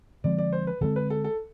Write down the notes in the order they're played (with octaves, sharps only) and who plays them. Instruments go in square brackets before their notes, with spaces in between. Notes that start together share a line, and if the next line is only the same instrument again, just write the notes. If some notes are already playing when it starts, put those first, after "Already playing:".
[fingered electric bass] D3 F3 G#3 C4 [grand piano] D5
[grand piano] D5
C5
B4
[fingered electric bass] D3 F3 G#3 C4 [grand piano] A4
[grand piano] B4
A4
A4